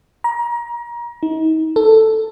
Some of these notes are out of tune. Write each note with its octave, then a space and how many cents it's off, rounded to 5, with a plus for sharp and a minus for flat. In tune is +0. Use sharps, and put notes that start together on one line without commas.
A#5 +30
D#4 +35
A4 +5